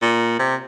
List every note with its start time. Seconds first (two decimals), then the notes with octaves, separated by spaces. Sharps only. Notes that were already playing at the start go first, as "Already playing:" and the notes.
0.02 A#2
0.39 C3